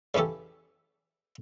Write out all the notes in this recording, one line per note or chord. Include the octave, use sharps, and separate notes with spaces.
C#3 E3 C#4 G4 A4